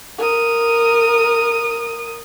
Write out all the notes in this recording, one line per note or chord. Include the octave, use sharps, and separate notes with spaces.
A#4 D#6